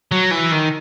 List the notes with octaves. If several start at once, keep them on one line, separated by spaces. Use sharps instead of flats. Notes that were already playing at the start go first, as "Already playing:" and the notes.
F#3
E3
D#3